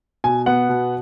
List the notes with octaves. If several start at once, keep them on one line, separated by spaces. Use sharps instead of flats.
B2 G#5
B3 F#5
B2